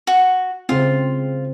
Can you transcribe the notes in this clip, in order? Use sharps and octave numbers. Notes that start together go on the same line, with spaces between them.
F#4
C#3 C4 F4